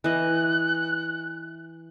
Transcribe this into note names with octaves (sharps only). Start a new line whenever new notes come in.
E3 D#5 F#6